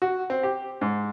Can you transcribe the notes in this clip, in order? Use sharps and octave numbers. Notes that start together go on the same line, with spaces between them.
F#4
C4
G4
G#2